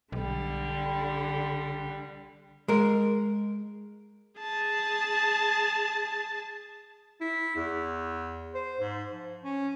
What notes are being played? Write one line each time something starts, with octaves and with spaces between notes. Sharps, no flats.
B1 D3 G3
G#3 A#4
G#4 A5
E4
E2
C5
G#2
F3
C#4